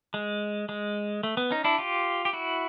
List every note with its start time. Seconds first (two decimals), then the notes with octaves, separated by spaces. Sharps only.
0.14 G#3
0.69 G#3
1.23 A3
1.37 B3
1.51 C#4 D#4
1.64 D4 E4
1.78 F4 G4
2.25 G4
2.33 E4 F#4